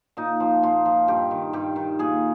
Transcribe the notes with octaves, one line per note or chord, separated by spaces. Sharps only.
A#2 D#4
F3
A#2 F4
F3
G2 G4
D#3
G2 G4
D#3
A#2 G#4